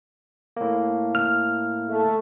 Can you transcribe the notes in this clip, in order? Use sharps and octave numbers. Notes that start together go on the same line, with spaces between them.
A2 A#3
F6
A3